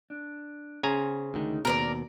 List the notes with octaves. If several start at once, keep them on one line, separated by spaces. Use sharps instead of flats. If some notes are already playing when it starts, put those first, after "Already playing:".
D4
C#3 C#4 C5 G#5 A#5
D2 D#3 G#3 D#4
D#2 B2 C4 A#4 B4 D5